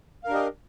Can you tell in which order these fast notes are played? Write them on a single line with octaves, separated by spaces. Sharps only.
F5 A#4 D4 G4 D#5